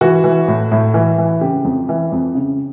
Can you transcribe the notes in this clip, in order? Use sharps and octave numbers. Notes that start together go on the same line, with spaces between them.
E3 F#4
E3
A2
A2
E3
E3
C#3 G4
F2
E3
F2
C#3